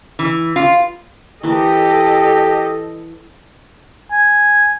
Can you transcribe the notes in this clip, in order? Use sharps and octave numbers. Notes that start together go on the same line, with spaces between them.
E3
F4
E3 G4 A4 A#4 D#5
G#5